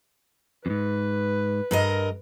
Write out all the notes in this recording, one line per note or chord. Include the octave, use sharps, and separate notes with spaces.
F2 G#2 B4
G2 A#4 D#5